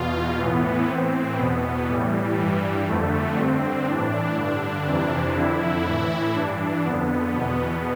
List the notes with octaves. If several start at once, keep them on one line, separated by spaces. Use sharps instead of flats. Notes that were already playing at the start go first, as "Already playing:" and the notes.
Already playing: E2 B2 F4
A2 E3 B3
A2 E3 C4
E2 B2 B3
A2 E3 G3
G2 E3
F2 D3 A3
G2 D3 C4
A2 E3 D4
G2 D3 D4
F2 C3 E3
F2 D3 E4
A2 E3
G2 E3 D4
F2 D3 B3
E2 B2